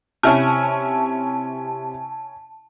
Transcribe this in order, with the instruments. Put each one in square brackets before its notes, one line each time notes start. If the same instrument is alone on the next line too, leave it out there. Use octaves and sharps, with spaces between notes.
[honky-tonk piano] C3 [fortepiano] C#4 E4 F6 [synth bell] A5